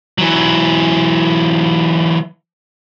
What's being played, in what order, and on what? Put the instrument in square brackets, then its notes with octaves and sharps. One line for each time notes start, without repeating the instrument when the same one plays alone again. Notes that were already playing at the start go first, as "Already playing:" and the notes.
[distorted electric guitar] E3 F#3